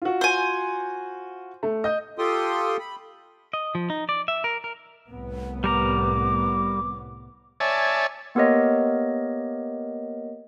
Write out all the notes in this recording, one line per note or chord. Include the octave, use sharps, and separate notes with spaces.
F4 F#4
C5 G#5
A3
D#5 G6
F4 G4 A4 G5 C6 D#6
B5
D#5
F3
D#4
D5
E5
A#4
A#4
C2 A2 B3
G3 A#4 A#5 D6
C#5 D5 E5 G#5 A5
A#3 B3 G4 A#4 C#5 D#5